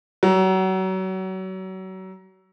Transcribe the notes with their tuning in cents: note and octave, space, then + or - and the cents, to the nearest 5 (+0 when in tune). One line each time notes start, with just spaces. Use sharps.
F#3 +30